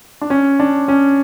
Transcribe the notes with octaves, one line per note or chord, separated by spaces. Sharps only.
D4
C#4
D4
C#4